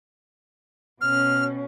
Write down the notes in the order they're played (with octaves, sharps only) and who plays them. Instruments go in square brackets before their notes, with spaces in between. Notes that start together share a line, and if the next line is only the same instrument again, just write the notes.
[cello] B2 C#4 [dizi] F6